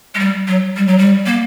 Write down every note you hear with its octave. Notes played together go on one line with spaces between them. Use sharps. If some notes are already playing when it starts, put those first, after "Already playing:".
G#3
G3
F#3
G3
F#3
G3
A#3